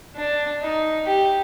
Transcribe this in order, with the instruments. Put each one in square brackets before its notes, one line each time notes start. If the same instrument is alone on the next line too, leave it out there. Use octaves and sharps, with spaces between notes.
[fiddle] D4
D#4
G4